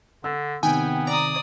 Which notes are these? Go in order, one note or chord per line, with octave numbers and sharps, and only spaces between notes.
D3 E6
C3 D#3 B3 G5 G#5
D5 A#5 D#6